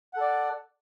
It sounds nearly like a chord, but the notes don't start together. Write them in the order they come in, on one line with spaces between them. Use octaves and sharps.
F#5 A4 D5